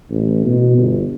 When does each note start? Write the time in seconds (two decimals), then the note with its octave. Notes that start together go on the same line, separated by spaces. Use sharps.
0.10 A1
0.45 B2
0.77 G1